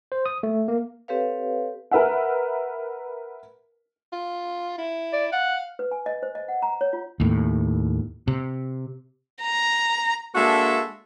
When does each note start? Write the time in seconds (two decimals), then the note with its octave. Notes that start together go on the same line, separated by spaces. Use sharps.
0.12 C5
0.26 D#6
0.43 A3
0.68 A#3
1.08 C4 G4 A4 B4 C#5 F5
1.91 A#4 B4 E5 F#5
4.13 F4
4.78 E4
5.13 D5
5.32 F5 F#5
5.79 B4
5.91 G#5
6.06 D#5
6.23 C5
6.35 D#5
6.48 F#5
6.62 A#5
6.81 C#5
6.93 F4
7.20 D#2 A2
8.28 C3
9.43 A#5
10.34 G#3 A#3 D4 F#4 A4 E5